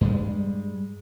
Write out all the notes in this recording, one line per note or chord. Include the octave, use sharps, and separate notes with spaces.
G2 G3 G#3